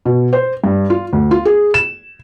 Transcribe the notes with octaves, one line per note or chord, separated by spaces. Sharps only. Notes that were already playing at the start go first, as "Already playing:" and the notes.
B2
C5
G2
F4
D2
F4
G#4
E7